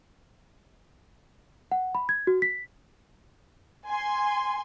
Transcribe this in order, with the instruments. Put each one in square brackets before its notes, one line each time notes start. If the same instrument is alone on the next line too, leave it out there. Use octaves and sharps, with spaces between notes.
[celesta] F#5
B5
G#6
F#4
B6
[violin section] G#5 C6